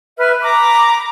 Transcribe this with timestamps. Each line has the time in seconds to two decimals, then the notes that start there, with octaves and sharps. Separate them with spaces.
0.18 B4 E5 F6
0.42 A#5 B5 D6